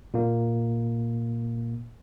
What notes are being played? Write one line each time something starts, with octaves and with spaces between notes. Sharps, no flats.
A#2 A#3